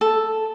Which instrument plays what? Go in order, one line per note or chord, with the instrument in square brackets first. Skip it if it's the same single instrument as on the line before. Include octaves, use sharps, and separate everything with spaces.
[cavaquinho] A4